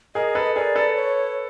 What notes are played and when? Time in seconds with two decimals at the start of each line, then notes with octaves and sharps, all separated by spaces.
0.15 G#4 A#4 D#5
0.35 A4 B4
0.56 G#4 A#4 D5
0.75 A4 B4
0.96 C#5